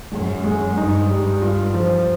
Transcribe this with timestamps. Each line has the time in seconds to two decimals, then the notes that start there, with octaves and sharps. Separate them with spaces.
0.12 F#2 G#3
0.44 G#3
0.77 G2 D#4
1.10 G3
1.42 F4
1.74 F3